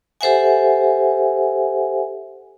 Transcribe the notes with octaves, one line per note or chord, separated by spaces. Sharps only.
G4 A4 C5 E5 F#5 G#5